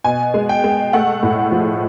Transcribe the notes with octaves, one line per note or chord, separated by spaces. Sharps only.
B2 G#5
G#3
G5
G#3
A3 F#5
A2
F3